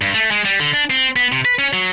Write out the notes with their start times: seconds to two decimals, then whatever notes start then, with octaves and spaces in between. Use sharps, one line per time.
0.01 G2
0.14 A3
0.31 G#3
0.45 G3
0.60 D3
0.73 D4
0.90 C4
1.16 B3
1.32 C3
1.45 B4
1.59 C#4
1.73 F#3